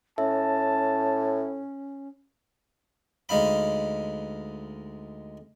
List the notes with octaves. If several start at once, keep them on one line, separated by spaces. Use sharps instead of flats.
A2 C#4 E5 A5
D2 G#3 D#4 F5 B5